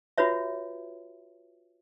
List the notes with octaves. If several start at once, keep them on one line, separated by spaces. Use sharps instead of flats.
F4 F#4 B4 C#5 E5